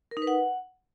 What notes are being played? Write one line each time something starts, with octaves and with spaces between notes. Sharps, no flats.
A#4
D#4
B4
F#5